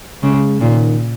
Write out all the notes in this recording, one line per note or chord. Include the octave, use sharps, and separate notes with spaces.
C#3 G#3
A#2 D#3